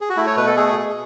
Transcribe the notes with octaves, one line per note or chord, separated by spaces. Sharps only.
G#4
F#4
A3 E4
C#5
B2 B4
A4
A3 G#4
B2